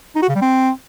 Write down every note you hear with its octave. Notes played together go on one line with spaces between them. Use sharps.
D#4
F#4
C#3
G3
C4